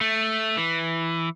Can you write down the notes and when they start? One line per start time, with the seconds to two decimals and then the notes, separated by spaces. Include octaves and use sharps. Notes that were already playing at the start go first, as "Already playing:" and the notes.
0.01 A3
0.57 E3